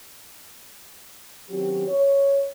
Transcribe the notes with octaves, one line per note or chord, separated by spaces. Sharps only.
D#3 F#3 C4 C#4 G4
C#5